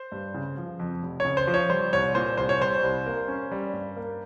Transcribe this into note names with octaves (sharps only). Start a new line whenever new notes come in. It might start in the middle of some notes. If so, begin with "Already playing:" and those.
Already playing: C5
G2
C#3
F3
F2
F1
C#3 C#5
C5
F3
C#5
G3 C5
C2 C#5
A#2 C5
C2 C5
C#5
G3 C5
C2
A#3
C#4
G3
G2
A#3